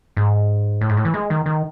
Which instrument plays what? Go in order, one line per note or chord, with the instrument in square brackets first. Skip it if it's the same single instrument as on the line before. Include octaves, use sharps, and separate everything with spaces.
[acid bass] G#2
A2
G#2
A2
E3
G#3
D#3
D#3